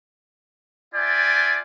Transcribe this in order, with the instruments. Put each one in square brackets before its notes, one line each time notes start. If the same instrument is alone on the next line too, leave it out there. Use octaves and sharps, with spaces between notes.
[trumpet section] F4 D5 E5 G5 G#5